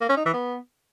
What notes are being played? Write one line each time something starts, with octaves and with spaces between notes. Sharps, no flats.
A#3
C#4
D#4
E3
B3